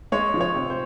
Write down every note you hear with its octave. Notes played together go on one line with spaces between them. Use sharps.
G#3 C#5
F3
C#5
C3
C5